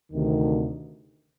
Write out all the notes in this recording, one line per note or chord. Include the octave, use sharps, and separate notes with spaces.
D2 C3 D#3